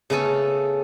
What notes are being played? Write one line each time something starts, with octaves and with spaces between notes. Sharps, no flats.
C#3 A3 B3 C#4 A4